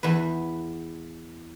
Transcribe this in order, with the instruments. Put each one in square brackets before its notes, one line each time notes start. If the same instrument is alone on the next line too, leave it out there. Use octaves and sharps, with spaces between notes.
[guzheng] E2 B4